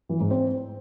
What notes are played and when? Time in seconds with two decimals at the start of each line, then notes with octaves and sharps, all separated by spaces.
0.09 E3
0.20 G#2
0.31 C4